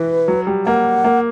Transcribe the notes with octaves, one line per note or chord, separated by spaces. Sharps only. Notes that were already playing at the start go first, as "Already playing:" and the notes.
Already playing: E3 B4
F#3
G3
A#3 F#5
A#3